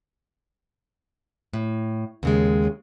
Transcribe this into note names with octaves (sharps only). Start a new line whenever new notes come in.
A2
D#2 C#3 G#3